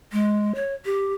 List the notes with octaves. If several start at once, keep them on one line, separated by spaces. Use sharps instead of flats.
G#3
C#5
G4